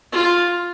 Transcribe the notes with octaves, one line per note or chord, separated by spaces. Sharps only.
F4